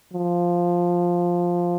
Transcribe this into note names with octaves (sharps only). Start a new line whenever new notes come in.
F3